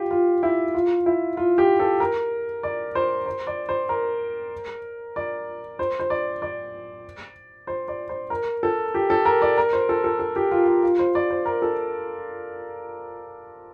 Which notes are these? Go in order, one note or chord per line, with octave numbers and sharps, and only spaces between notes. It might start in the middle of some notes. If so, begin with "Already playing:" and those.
Already playing: F4 G4
F4
E4
F4
E4
F4
G4
A4
A#4
D5
C5
C5
D5
C5
A#4
D5
C5
C5
D5
D5
C5
D5
C5
A#4
A4
G4
A4
A#4
D5
A#4
C5
A4
A4
A4
G4
F4
F4
F4
C5
D5
C5
A#4
A4